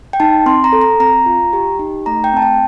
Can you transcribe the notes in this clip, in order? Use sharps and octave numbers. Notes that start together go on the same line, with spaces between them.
G5
D#4 A5
C4 C6
A#5
A4
A#5
C4 A#5
F4
G4
D#4
A3 A#5
G5
C4 A5
G5